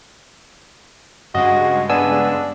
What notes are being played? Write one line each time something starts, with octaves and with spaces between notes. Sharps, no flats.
G2 C#3 G#3 F#4 D#5
B3 D4 G#5 E6